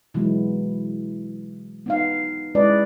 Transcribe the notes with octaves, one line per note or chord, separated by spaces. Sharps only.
B2 E3 F#3 G#3 B3 E4
B3 D#4 F5
G#3 C#4 E4 B4 D5 D#5